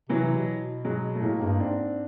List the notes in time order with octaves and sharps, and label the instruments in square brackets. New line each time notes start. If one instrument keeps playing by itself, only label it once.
[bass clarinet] C3 [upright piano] E3 F#3
[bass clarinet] C3
B2
[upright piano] F#3 G#3
A3
[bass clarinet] A2 [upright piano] G#3 A#3
[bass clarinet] G2 [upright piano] G#3 A#3
[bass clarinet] G#2 [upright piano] C4 D4